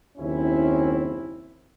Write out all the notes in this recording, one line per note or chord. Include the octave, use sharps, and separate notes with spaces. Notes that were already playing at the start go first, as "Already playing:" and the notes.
F#1 D#2 C4 C#4 E4